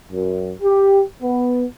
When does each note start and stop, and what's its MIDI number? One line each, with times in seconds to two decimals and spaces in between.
0.11 0.53 42
0.61 1.01 67
1.22 1.64 59